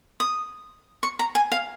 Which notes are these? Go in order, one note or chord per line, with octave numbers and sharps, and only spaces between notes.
D#6
C#6
A#5
G#5
F5